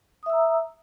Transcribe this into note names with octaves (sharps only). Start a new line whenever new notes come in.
E5 A#5 D#6 E6